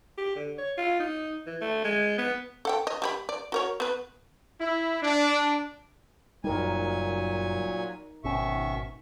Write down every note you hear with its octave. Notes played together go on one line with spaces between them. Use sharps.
G4
D3
C#5
F4
D#4
E3
A3
G#3
B3
A4 F#5 G5
D#5
G3 G4 B5
D5
F#4 A#4 C#5
B3 B4
E4
D4
F#1 A#2 F#3 G3 D#4 A#4 G#5
G#1 B2 D#3 C#4 E5 C#6